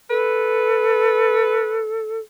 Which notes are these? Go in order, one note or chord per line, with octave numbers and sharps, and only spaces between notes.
A4 B4